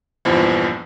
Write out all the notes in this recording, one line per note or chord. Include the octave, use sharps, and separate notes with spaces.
A#1 E2 G2 E3 F3